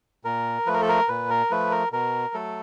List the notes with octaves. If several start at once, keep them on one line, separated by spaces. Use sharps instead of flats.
A#2 A#4
F3 A3 B4
A#4
A4
A#4
A#2 B4
A#4
F3 A3 B4
A#4
B2 A#4
F#3 A3 A4